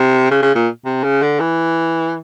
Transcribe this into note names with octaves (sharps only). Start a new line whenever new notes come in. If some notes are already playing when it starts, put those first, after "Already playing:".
Already playing: C3
C#3
C#3
A#2
C3
C#3
D3
E3